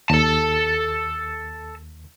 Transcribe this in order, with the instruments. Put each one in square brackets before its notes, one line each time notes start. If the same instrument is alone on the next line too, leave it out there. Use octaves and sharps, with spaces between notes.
[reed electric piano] D#2 [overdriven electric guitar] A4 A5